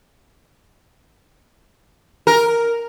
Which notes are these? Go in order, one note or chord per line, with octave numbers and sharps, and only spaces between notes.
A#4